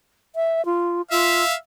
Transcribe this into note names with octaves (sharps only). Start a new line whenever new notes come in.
E5
F4
F4 E5 F5